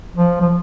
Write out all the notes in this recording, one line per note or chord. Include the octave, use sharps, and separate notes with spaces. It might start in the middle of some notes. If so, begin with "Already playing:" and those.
F3
F3